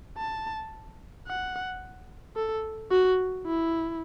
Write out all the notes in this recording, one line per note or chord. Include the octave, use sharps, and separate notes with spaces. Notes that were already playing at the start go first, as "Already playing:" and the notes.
A5
F#5
A4
F#4
E4